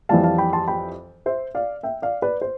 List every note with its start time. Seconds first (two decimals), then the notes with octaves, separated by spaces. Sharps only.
0.09 F2 E3 G3 F5 A5
0.24 F5 A5
0.38 G5 B5
0.53 A5 C6
0.68 G5 B5
1.26 C5 E5
1.55 D5 F5
1.83 E5 G5
2.02 D5 F5
2.22 B4 D5
2.41 C5